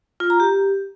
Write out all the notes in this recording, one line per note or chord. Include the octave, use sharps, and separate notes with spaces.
F4
A#5
G4